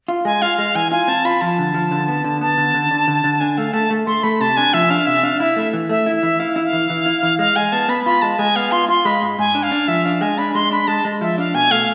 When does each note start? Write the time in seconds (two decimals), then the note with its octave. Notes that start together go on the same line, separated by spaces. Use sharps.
0.08 F4
0.25 G#3 G#5
0.42 F4 F5
0.58 G#3 F5
0.75 E3 G#5
0.92 F4 G#5
1.08 C4 A5
1.25 F4 B5
1.41 F3 A5
1.59 D3
1.74 F3
1.91 D3
2.08 B3
2.24 D3
2.41 B3 A5
2.58 D3
2.74 D3
2.91 D3
3.08 D3
3.24 D3
3.40 D4 G#5
3.57 A3 F5
3.73 A3 A5
3.90 A3
4.07 A3 C6
4.23 A3 B5
4.40 C3 A5
4.57 D4 G#5
4.73 F3 E5
4.90 D4 F5
5.06 C3 E5
5.23 D4 F5
5.40 E4 E5
5.56 A3
5.73 E3
5.89 A3 E5
6.06 E4
6.15 E5
6.23 E3
6.39 E4 F5
6.56 E4
6.64 F5
6.73 E3
6.90 E3
7.06 E4
7.23 E3
7.39 G#3 F5
7.56 G#3 G#5
7.72 B3 A5
7.89 B3 B5
8.05 F4 B5
8.22 G#3 A5
8.39 G#3 G#5
8.55 B3 F5
8.71 F4 C6
8.89 F4 C6
9.05 G#3 B5
9.22 G#2
9.38 G#2 G#5
9.55 D4
9.63 F5
9.71 D4
9.88 F3 E5
10.05 D4 F5
10.21 G#3 G#5
10.38 D4 B5
10.54 G#3 C6
10.71 D4 B5
10.87 G#3 A5
11.05 G#3
11.21 F3 E5
11.38 D4 F5
11.54 B2 G#5
11.71 A3 F5